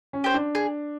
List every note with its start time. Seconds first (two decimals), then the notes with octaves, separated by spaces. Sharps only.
0.13 C#4
0.24 G4 C5
0.34 D4
0.55 G#4